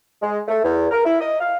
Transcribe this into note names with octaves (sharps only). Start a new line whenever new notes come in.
G#3
A3
E2
A#4
E4
D#5
F5